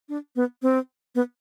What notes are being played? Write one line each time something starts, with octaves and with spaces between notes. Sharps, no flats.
D4
B3
C4
B3